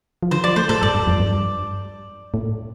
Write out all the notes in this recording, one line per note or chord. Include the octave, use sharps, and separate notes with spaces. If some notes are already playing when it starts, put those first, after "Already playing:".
F3
D3 C5
F3 D5
A3 C5
A2 A4
G2 D5
G2
F2
G2
A2